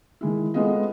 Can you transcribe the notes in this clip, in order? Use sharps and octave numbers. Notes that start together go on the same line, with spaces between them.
D#3 G#3 E4
G#3 A3 B3 F4 D#5